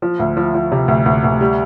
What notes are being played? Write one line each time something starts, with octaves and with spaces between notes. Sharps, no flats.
F3
D2
F3
F3
C3
D2
D2
D2
G3